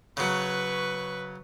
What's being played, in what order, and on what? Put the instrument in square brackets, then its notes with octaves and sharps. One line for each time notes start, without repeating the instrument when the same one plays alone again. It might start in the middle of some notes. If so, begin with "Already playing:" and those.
[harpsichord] C#3 F#3 [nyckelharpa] B4 C#6